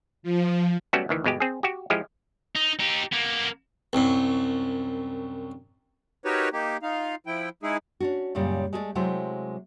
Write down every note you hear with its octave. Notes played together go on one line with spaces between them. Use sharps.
F3
F#3 G3 A3 B3 C#4 F#4
D2 D#3 E3
G1 B2 G#3 G4
C4 G#4
F#4 G4
F3 G#3 E4 G4
D#4
D#4 G4
A#3 B3
C2 F#2
D#4 F#4 G4 A#4 B4 C#5
A#3 D#4 G4
D#4 F4 F5
F3 E4 G5
G#3 D#4 E4 G#4
C#4 D4 F#4
F#2 A#2 C#3 G3
G#3 A3 G#4 B4 D5
C3 F#3 G#3 A3 E4 C5